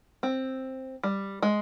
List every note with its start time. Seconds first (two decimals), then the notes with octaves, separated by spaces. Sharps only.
0.23 C4
1.04 G3
1.43 G#3